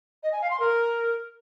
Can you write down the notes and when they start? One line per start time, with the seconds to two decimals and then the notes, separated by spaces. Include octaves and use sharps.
0.23 D#5
0.32 G#5
0.41 F5
0.51 C6
0.60 A#4